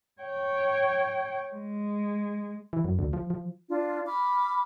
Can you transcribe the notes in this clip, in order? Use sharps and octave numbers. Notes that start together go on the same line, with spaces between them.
C#5 G5
G#3
E3
F#2
D2
F3
F3
D4 F4
B5 D6 F6